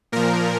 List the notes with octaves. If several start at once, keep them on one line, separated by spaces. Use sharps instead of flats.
A#2 F3 A#4